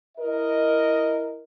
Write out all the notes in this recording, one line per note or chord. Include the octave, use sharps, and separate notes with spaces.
E4 A#4 D#5